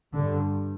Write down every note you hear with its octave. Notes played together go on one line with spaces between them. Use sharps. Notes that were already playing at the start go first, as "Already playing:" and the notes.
G2 D3